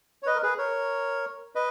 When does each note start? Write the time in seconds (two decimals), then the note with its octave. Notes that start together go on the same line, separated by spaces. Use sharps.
0.23 C#5
0.26 B4 D#5
0.35 A#4
0.42 G#4 B4
0.58 A#4 C#5
1.55 B4 D#5